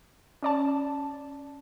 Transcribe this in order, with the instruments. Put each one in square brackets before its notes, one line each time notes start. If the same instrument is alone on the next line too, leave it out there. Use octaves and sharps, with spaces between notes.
[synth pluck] C#4 D5 A5